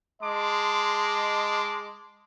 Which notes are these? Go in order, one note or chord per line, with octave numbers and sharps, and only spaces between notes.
G#3 D#5 A5 C6 D6